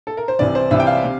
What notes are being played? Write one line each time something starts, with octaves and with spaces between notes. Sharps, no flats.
A4
A#4
C5
C2 C3 E3 D5
C5
C2 C3 E3 E5
G5
F5
C3